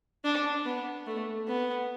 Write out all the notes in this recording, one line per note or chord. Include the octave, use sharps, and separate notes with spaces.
D4
B3
A3
B3